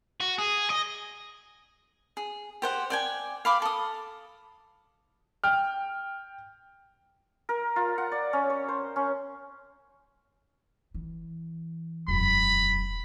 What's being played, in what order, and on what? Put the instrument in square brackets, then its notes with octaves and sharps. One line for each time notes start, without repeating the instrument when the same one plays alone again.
[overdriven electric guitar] F#4
G#4
D#5
[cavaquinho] G#4
G4 C5 F#5
D5 G5 G#5
F5 B5 D6
A4 D#6
[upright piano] G5 F6
[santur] A#4
F4
F#5
D5
C#4
C#5
C5
C#4
[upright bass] E3
[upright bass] E1 F#2 [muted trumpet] B5